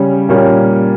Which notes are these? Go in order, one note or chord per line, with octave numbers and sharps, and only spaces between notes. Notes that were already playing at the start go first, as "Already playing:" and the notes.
Already playing: C#3 G3 C#4
A#2 G3 A#3 C#4